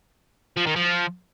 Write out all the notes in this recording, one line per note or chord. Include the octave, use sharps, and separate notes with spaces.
F3
D#3
F3